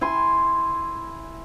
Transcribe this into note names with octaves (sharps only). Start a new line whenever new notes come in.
E4 G#5 C6